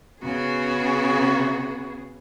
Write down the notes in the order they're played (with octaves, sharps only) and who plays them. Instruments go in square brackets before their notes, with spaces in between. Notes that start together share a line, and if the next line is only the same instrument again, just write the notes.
[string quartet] C#3 B3 F#4 G#4